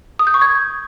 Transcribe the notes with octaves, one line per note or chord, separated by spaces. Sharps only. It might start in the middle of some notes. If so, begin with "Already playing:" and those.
D#6
G6
C#6
G#6